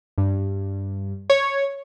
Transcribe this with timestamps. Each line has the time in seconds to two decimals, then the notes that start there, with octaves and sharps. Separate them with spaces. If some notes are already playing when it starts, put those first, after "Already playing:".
0.18 G2
1.30 C#5